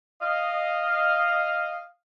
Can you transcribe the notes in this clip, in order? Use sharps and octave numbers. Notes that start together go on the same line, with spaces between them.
D#5 F5